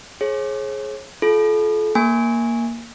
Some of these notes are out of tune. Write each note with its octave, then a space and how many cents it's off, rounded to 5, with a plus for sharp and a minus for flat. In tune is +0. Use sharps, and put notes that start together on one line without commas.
G#4 +20 C#5 -40
F4 +0 A4 -35
A#3 +0 G#5 -5 C#6 +0